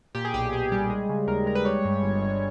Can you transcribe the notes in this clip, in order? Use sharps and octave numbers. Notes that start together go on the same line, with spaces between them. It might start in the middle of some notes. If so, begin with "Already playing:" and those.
A#2 G4
G#4
B1 G4
B1 G#4
G3 G4
G#3 G#4
C#3
D#2 A#4
G#3 A#4
B4
G3 C#5
G2
G1
G1